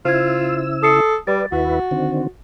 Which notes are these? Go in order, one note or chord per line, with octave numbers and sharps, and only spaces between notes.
C#3 E4 F4 C5 E6 G#6
A4 D#6 C7 C#7
G3 B4 D5 A6
D#2 E4 F#4 B4
D3 D#3 C4